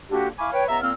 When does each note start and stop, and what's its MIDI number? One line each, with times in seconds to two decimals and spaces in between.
0.11 0.28 50
0.11 0.28 58
0.11 0.28 62
0.11 0.28 66
0.11 0.28 67
0.39 0.50 64
0.39 0.50 77
0.39 0.50 80
0.39 0.50 83
0.39 0.50 85
0.39 0.50 86
0.53 0.64 71
0.53 0.64 73
0.53 0.64 79
0.68 0.80 37
0.68 0.80 59
0.68 0.80 76
0.68 0.80 82
0.82 0.91 46
0.82 0.91 58
0.82 0.91 60
0.82 0.91 88
0.82 0.91 89